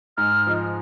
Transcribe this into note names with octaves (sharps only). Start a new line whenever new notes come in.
G#2 F6
F3 G#3 D#4